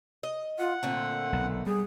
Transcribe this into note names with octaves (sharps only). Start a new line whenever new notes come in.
D#5
F4 F#5
A#2 D3 A3 C4
B1
G3 G#4